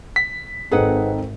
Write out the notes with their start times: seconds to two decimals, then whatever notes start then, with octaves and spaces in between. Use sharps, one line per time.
0.16 B6
0.71 G#1 C4 D#4 G#4 A4 B4 F#5